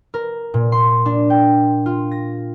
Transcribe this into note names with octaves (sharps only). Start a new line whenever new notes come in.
A#4
A#2
C6
D4
G5
F4
A#6